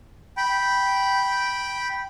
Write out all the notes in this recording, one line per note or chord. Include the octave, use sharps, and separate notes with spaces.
G5 B5